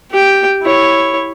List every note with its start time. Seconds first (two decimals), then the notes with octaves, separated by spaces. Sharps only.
0.11 G4 G5
0.62 E4 C#5